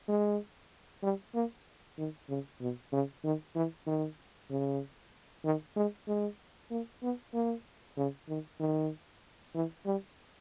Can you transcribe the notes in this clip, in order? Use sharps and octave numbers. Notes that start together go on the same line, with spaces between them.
G#3
G3
A#3
D#3
C#3
B2
C#3
D#3
E3
D#3
C#3
D#3
G#3
G#3
A#3
B3
A#3
C#3
D#3
D#3
E3
G3